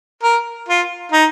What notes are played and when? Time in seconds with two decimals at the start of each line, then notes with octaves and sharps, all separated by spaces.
0.23 A#4
0.68 F4
1.12 D#4